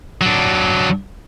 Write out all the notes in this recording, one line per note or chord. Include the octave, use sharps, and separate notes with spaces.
F#3 D4